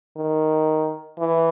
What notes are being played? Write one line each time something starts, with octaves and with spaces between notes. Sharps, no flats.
D#3
E3